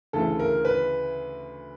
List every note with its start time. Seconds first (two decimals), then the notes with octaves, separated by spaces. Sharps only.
0.13 D2 C#3 E3 A4
0.40 A#4
0.65 B4